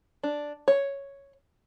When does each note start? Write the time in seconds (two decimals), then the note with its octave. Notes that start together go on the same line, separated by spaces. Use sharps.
0.23 D4
0.68 C#5